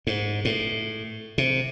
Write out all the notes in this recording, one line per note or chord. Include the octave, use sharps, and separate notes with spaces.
G#2
A2
C3